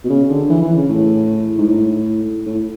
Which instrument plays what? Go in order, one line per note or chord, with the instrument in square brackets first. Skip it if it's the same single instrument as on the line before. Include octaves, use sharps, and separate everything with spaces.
[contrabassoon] B2
C#3
D3
E3
E3
C#3
A2
G#2
A2
A2